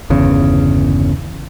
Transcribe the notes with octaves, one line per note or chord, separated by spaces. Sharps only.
G1 E2 C#3